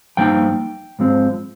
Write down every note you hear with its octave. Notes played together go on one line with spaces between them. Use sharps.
G2 F3 A#3 D#4 G5
G#2 F3 G#3 C4